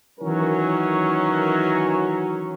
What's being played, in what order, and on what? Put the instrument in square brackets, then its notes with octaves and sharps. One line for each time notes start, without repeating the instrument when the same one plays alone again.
[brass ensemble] D#3 E3 F#3 C#4 A#4